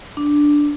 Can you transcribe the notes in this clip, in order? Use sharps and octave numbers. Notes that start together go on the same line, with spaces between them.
D4